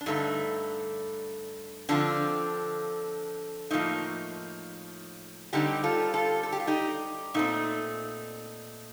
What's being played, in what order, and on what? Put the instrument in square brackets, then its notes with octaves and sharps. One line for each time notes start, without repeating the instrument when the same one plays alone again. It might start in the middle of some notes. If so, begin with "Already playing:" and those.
[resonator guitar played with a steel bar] D4
G2 D3 A3 D#4
D3 F3 C4 D4
A2 F3 A#3 D#4
D3 G3 C4 D#4 G4
F4 A4
F4 A4
A4
G4
F4
D#4 G4
A#2 A3 C4 D#4